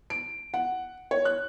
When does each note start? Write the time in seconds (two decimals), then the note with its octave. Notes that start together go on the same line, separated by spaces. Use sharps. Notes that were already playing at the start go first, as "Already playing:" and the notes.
0.10 D7
0.54 F#5
1.11 C#5
1.25 F#6